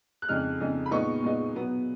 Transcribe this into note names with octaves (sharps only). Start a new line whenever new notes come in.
F#6
F2 C#3 G#3 D#4 F6
F2 C#3 G#3 D#4
B5
A#2 G#3 B3 D#4 C#6
A#2 G#3 B3 D#4
B2 F#3 B3